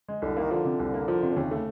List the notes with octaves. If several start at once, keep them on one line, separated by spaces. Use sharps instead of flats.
G#3
C2 D3
D#3 A#3
D3 F3
C3
C2
A#3
F3
C3
D3
D#2 C#3
A3